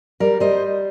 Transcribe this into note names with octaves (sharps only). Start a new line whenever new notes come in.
G3 A#4 D5
G3 C5 D#5